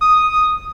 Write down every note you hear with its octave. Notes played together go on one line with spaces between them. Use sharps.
D#6